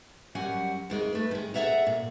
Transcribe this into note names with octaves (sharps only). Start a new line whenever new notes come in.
F#2 F#3 G3 F#5 G#5
F2 D#3 G#3
A3 B4
D#3 G#3
G#4 A4 D5 E5 F#5 A#5
A#2